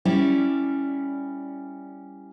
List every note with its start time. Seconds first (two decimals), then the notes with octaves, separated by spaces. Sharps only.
0.05 G3 C#4 E4 D5